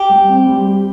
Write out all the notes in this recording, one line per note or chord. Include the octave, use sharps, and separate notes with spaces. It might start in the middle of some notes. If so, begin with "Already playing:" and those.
Already playing: G4
G3
C4
G3
G4